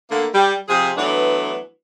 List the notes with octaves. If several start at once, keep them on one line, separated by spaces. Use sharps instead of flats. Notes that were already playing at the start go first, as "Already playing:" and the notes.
D3 A3 A#3
G3
C3 F3 G#4
E3 F#3 A3 B3 D4